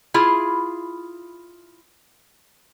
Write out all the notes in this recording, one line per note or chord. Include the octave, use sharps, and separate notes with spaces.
E4 F4 G#4